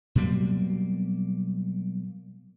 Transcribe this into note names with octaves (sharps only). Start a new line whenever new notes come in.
B2 F#3 G3 A#3